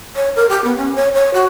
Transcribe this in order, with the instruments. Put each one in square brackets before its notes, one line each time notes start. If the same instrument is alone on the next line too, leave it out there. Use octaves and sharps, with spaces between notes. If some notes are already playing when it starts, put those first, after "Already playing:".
[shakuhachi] C#5
A#4
G4
B3
C#4
C#5
C#5
F#4